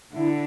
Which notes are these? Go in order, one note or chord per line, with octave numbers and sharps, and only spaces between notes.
D3 E4